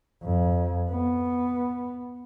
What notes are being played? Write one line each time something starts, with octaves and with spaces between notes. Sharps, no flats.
F2
B3